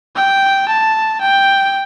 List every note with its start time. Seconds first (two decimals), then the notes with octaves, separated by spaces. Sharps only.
0.16 G5
0.69 A5
1.21 G5